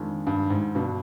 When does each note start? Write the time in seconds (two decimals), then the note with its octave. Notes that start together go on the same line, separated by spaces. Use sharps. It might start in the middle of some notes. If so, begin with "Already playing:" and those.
Already playing: F2 D#3 G#3 D4
0.27 G2
0.50 G#2
0.75 G2 B2 D3